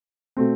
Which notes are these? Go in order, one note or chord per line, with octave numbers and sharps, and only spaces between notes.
B2 A3 C4